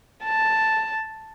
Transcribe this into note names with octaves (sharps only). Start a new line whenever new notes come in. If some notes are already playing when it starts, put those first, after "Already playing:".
A5